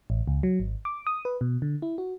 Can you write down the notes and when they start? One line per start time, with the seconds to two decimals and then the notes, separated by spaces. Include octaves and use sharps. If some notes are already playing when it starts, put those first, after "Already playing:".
0.10 A1
0.28 C#2
0.43 F#3
0.60 G#1
0.85 D6
1.07 D#6
1.25 B4
1.41 B2
1.62 D3
1.82 E4
1.98 F#4